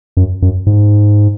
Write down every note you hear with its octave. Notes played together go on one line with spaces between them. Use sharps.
F#2
F#2
G#2